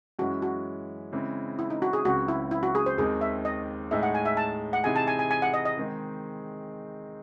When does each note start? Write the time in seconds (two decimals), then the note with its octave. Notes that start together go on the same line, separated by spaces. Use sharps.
0.19 F#2 E3 G#3 C#4 F#4
0.42 F#4
1.12 C#3 E3 G#3 C4
1.59 E4
1.70 D#4
1.82 F#4
1.93 G#4
2.05 C#2 C#3 F#3 C4 F#4
2.28 E4
2.51 E4
2.63 F#4
2.75 G#4
2.86 C5
2.97 D#2 D#3 G#3 C4 G#4
3.21 E5
3.45 D#5
3.91 A2 G#3 D#4 G#4 E5
4.03 F#5
4.14 G#5
4.25 E5
4.37 A5
4.73 F#5
4.84 C3 E3 C4 D#4 G#4 G#5
4.96 A5
5.07 G#5
5.19 G#5
5.31 G#5
5.42 F#5
5.54 D#5
5.65 D#5
5.77 D#3 G#3 C4 D#4 G#4